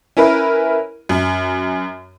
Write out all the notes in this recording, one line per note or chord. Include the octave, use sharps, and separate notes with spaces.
C#4 E4 A#4 B4
F#2